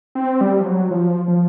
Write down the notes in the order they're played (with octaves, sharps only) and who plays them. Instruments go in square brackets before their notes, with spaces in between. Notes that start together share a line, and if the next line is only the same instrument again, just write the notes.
[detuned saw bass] C4
G3
F3
F#3
F3
F3